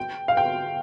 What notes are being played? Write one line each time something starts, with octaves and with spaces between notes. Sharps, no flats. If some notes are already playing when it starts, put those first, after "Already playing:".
Already playing: G5
F5
G5